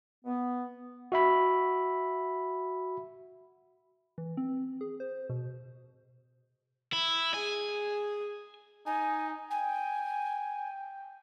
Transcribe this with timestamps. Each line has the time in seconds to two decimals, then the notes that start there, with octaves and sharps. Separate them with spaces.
0.25 B3
1.12 F#4 E5 B5
4.18 E3
4.37 C4
4.81 G#4
5.00 C5
5.30 B2
6.93 E4
7.34 G#4 G#5
8.86 D#4 G#5
9.50 G5 G#5